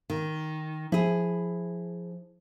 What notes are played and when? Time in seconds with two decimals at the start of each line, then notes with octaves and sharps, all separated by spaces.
0.10 D#3
0.92 F3 E4 G#4